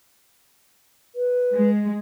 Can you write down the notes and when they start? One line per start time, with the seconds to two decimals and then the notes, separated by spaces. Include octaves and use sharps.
1.15 B4
1.54 G#3